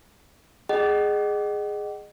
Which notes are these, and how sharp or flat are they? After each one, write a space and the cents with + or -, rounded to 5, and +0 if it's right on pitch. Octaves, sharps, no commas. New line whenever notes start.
G#4 +0 D#5 -30 F#5 +40